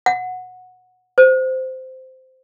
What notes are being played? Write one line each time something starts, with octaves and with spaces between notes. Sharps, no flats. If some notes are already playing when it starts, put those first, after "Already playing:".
F#5
C5